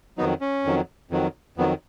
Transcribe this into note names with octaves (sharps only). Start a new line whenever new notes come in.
F2 D#3 F#3 B3 D#4
C#4
F2 D#3 F#3
F2 D#3 F#3
F2 D#3 F#3 B3